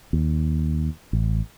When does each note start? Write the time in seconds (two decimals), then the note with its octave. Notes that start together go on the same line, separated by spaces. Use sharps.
0.13 D#2
1.13 A1